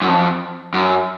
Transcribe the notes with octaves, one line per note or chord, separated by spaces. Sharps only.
F#2
F2
F#2